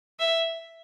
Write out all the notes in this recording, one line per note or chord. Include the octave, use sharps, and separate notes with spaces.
E5